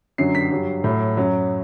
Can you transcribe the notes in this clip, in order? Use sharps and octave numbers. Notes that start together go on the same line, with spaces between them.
F#2 D3 F#3 C7
B6
G2 F#3
A2 F#3
F#2 F#3